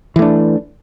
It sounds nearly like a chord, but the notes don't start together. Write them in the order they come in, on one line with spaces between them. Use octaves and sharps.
E3 A3 D4